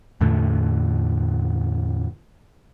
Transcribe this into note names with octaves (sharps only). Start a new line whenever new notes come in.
E2 A2 D3 A3